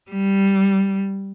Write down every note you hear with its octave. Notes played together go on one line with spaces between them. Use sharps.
G3